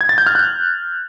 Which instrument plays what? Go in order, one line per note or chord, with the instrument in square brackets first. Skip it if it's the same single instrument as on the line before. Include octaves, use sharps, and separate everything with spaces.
[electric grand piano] G#6
A6
G6
F6
F#6